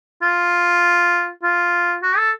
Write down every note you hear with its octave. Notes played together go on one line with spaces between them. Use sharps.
F4
F4
F#4
A4